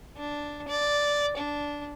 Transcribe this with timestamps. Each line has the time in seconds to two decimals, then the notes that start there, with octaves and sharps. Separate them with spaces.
0.17 D4
0.68 D5
1.37 D4